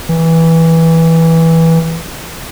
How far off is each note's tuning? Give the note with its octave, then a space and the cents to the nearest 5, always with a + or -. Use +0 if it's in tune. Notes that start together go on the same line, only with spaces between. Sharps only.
E3 -10